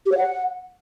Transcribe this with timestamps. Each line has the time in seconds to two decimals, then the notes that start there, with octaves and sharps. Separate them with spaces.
0.06 G4
0.12 C#5
0.18 F#5